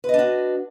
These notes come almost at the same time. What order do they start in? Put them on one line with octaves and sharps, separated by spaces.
B4 D#5 D4 F#4